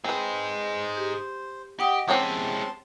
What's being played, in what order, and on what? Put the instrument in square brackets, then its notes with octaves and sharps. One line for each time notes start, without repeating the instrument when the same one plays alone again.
[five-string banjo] C4 B4 [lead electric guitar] D#4 G#4 [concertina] C5
[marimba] G4
[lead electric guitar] G4 [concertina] D#5 [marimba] F#5 G5 D#6
[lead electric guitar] G#3 E4 [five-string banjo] C4 C#4 G4 [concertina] A5 C6